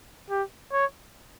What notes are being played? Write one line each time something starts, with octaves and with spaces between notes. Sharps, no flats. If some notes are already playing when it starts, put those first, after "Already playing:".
G4
C#5